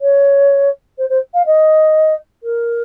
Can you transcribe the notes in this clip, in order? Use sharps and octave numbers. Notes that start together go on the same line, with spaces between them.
C#5
C5
C5
F5
D#5
A#4